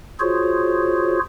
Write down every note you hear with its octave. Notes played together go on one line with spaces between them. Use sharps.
F4 F#4 G#4 C5 C#5